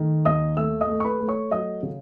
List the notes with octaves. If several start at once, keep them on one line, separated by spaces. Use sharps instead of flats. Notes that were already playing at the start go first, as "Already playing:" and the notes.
Already playing: D#3 A3
D#2 D#5 D#6
A3 E5 E6
D#5 D#6
A3
C#6
B4 B5
A3
C#5 C#6
F#3 D#5 D#6
C#3